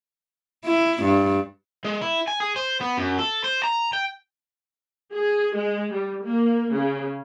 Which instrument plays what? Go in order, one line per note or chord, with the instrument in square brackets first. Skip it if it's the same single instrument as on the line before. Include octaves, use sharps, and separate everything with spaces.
[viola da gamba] E4
G2
[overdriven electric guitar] G#3
E4
G#5
G#4
C5
B3
F#2
A4
C5
A#5
G5
[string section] G#4
G#3
G3
A#3
C#3